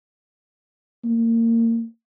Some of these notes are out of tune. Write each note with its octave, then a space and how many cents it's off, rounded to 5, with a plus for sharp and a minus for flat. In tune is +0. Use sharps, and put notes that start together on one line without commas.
A#3 -25